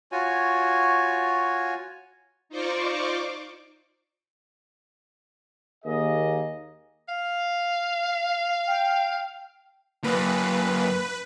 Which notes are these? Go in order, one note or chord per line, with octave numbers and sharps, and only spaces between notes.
F4 F#4 C#5 G#5
D#4 F4 C5 D5 C#6 D6
D#2 A#3 G#4 D#5
F5
G5
F#2 A#3 B4